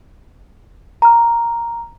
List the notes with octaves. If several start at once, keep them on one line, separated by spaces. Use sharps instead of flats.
A#5 F6